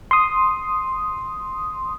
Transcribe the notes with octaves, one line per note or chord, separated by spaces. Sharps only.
C6 D#6